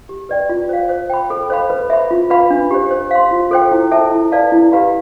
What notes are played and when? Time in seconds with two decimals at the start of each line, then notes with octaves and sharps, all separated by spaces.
0.09 G4
0.29 B4 D5 G5
0.49 F4
0.69 C5 F5
0.89 C5
1.10 G5 B5
1.30 A4
1.50 C5 F5 B5
1.70 B4
1.90 E5 B5
2.11 F4
2.30 B4 F5 B5
2.50 D4
2.71 G4 C5
2.91 C5
3.11 F5 C6
3.31 F4
3.51 A4 C5 G5
3.71 E4
3.91 A4 E5 A5
4.12 E4
4.32 B4 D5 F5 A5
4.52 E4
4.72 G4 B4 F5 B5